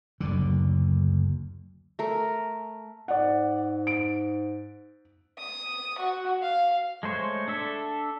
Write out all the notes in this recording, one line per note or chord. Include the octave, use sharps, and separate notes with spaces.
F#1 D2 D3
A3 A#4
G#2 D5 F#5
D7
D#6
F#4
F5
G#3 A3 C5 C#5
D4 A4 E5